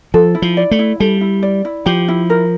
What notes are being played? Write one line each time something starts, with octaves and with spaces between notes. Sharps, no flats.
F3 A4
E4
F3
D5
A3
E4
G3 A4
E4
D5
E4
F3 G4
E4
A#4